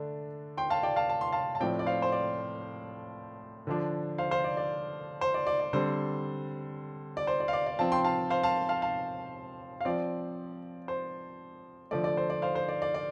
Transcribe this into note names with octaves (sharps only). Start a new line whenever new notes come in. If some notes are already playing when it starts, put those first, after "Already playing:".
Already playing: D3 A3 D4
G5 C6
F5 A5
D5 G5
F5 A5
A5
C6
F5 A5
A5
A2 F3 C4 D5 G5
D5
C5 F5
C5
D5
D3 F3 D4
C5 F5
C5 F5
D5
D5
C5
D5
D5
D5
D3 G3 C4 C5
D5
C5
D5
F5
D5
D5
F3 C4 F5 A5
G5 C6
F5 A5
C5 F5
F5 A5
F5 A5
F5 A5
F5
F3 C4 D5
C5
D3 F3 A3 D5
D5
C5
D5
C5 F5
C5
D5
D5
D5